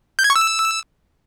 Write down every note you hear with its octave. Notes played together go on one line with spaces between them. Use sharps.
G6
G#6
C#6
E6